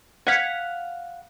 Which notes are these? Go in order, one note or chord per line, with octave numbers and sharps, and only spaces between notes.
F5 F#5 G#6 B6 C#7